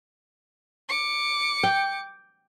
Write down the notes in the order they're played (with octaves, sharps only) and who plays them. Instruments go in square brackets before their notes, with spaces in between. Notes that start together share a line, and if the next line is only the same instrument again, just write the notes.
[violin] D6 C#7
[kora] G5